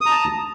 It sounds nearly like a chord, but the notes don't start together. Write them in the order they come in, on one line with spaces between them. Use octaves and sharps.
D#6 A#5 A5